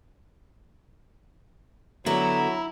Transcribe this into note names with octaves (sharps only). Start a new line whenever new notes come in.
D3 F#3 B3 E4 A#5